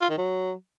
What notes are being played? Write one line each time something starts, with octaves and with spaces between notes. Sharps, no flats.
F4
D#3
F#3